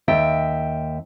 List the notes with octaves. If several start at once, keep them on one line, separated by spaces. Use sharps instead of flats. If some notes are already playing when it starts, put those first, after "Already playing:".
D#2 E5 G5